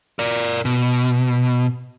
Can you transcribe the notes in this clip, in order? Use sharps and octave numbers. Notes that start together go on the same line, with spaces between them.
A#4 D5
B2